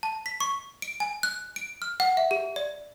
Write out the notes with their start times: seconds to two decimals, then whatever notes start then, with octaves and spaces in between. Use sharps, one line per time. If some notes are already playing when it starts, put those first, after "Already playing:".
0.03 A5
0.26 B6
0.40 C#6
0.82 D7
1.00 G#5
1.23 F#6
1.56 D7
1.82 F6
2.00 F#5
2.17 E5
2.31 G4
2.56 D5